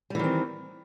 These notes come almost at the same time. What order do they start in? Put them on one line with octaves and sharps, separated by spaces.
G3 E3 D#3 C4